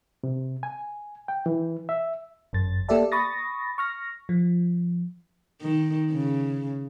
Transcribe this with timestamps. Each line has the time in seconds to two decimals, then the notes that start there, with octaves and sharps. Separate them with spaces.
0.23 C3
0.63 G#5
1.28 G5
1.46 E3
1.89 E5
2.53 G1 F#2 A6
2.89 A#3 G4 A4 D5 E5 A5
3.12 B5 C#6 D#6 A6 A#6
3.78 C#6 F6 A#6
4.29 F3
5.62 D#3
6.11 C#3